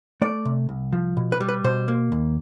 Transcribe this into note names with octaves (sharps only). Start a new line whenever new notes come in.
A3 D5
C3
C2
F3
B2
B4
G3
B4
B2 C5
A#3
D#2